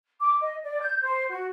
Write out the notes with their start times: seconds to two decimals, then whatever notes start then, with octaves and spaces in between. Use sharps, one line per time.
0.20 D6
0.41 D#5
0.63 D5
0.80 G6
1.01 C5
1.29 F#4